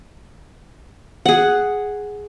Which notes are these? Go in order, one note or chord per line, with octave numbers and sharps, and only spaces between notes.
G#4 F#5